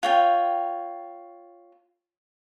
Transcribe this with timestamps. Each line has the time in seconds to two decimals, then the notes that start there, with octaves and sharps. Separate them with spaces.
0.03 F4 C#5 G5